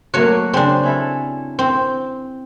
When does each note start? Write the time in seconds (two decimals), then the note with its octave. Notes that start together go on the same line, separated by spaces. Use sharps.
0.14 F#3 A3 A#3 F#4 C#5
0.53 C#3 C4 D4
0.83 C#4 E4 A4
1.59 C4